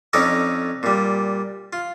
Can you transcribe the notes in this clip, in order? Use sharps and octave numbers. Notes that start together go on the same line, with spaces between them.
F2 C#4 D#4 A4 D5 D#5
A#2 G3
F4